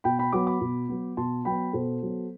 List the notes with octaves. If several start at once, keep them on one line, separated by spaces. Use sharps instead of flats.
B2 G5 B5
G5 B5
F#3 B3 B5 D6
B5 D6
B2
F#3 B3
B2 A5 C6
F#3 B3 G5 B5
B2 A4 C5
F#3 B3